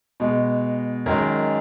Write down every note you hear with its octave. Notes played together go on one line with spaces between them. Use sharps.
B2 G#3
F#2 D#3 G#3 A#4